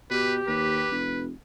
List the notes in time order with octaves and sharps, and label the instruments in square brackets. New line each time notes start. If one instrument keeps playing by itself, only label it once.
[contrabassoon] B2 [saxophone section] G4 [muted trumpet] B4
[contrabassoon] D#2 [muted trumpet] B4
[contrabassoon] F1